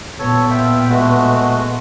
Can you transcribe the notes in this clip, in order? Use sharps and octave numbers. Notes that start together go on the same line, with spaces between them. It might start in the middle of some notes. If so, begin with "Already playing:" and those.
A#2 B3 A4 C#5
F4 E5 G5
G#3 A3 F#4